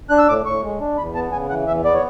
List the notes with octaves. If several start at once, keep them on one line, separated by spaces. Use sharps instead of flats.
D4 F#6
E6
A2 D6
A2 C#6
G#3
D4
E2 B5
B3 A5
C#3 G#5
E3 F#5
E2 E5
B3 D5
C#5